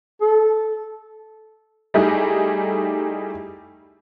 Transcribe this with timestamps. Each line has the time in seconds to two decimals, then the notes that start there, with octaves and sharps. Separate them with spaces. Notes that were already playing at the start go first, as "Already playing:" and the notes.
0.22 A4
1.94 G3 A3 D#4 E4 G4 G#4